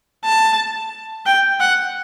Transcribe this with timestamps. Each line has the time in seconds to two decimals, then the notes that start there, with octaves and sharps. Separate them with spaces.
0.25 A5
1.26 G5
1.60 F#5